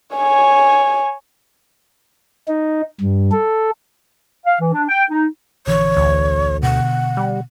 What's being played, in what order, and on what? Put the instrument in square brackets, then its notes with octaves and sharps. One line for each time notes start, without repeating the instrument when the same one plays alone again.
[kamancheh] C#5 G#5
[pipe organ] D#4
G2
A4
[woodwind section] F5
E3
D4
G5
D#4
[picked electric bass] A#1 D3 E3 [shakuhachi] C#5
[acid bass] D2
[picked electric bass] B2 D3 B3 [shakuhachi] F#5
[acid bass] G3